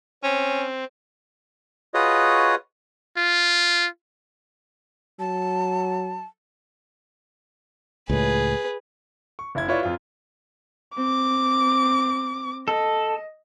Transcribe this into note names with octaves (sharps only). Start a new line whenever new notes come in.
C4 C#4
F4 F#4 G#4 B4 C#5 D#5
F4
F#3 A5
C#2 A2 G#4 B4
C#6
F#1 E4 G#6
E4 F4 B4 C#5 D5 E5
F2 F4
C4 D6
A4 D#5